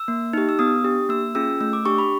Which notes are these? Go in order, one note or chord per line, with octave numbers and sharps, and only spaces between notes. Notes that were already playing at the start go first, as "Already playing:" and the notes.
Already playing: E6
A#3
D#4 G4
E6
B3 D#6
D4 G4
A#3 E6
C#4 F4 G#4 E6
A3 E6
D6
D4 G4 C#6
B5